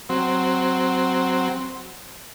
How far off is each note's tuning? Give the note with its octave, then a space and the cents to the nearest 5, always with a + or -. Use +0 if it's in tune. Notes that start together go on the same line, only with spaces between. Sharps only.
F#3 +0 C4 +0